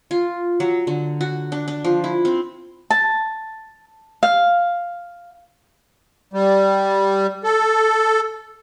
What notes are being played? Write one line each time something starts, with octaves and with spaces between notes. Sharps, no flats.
F4
F#3
D3
F#4
D4
D4
F3
E4
C4
A5
F5
G3
A4